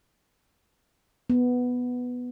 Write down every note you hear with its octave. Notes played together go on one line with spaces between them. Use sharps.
B3